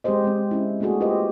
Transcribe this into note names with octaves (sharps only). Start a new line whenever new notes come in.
G#3 C4 G4 G#4 C5 D#5
G#3 C4
C4 C#4 E4
A3 A#3 D4 F#4 G#4 A4
F4 G4 B4 C5 D#5